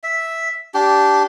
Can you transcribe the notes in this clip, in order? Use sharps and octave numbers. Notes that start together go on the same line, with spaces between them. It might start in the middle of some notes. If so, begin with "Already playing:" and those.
E5
D4 G4